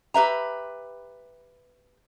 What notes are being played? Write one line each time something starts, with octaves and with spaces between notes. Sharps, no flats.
G4 B4 E5 A#5